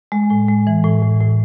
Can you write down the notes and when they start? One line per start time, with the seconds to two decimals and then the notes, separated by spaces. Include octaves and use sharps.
0.12 G#3
0.30 A2
0.49 G#3
0.67 E3
0.84 A2
1.03 A2
1.20 A2